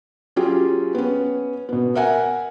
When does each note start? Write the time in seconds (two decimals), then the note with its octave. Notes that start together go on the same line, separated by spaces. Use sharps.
0.36 F#3 C#4 F4 G4 G#4
0.95 B3 C#4
1.69 B2 B3
1.95 A#4 E5 F#5 G#5